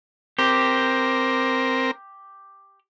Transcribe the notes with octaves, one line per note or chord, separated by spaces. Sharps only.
C4 G4 A#4